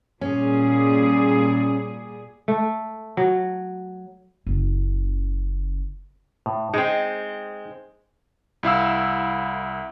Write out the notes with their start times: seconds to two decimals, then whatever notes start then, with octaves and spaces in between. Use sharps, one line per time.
0.21 A#2 G3 C#4 G#4
2.48 A3
3.17 F#3
4.47 F#1 C#3
6.46 A2
6.74 G#3 C4 D#4
8.63 C2 E4 F5 E6